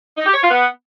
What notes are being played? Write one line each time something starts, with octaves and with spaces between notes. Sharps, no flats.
D#4
G4
C#5
F4
B3